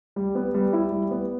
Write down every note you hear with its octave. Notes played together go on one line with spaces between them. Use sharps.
G3
B3
G3
E4
G3
B3